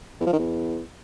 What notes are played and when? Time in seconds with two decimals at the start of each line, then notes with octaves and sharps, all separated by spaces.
0.20 E2
0.26 F3
0.33 D#3
0.39 E2